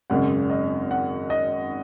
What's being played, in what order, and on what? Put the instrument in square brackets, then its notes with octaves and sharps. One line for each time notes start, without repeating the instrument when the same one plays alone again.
[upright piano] G#1 F#2 C#3 G#3 [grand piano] F#5
[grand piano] D#5
F#5
D#5